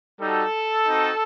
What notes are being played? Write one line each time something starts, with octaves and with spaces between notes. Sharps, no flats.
G3 D#4 F#4 A4
C4 D#4 F#4